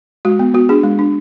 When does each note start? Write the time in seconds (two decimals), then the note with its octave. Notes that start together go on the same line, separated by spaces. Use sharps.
0.25 G#3 F#4
0.39 B3
0.54 B3 F#4
0.69 D4 G#4
0.83 G#3
0.99 D4